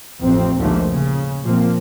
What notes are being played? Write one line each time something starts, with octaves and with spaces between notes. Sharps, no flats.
A1 F2 C4
A#1 D#2 G#2 D3 F3 A3
C#3
A#2 F3 A#3 C4